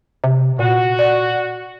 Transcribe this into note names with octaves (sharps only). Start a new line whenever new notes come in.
C3
A#2 F#4
D5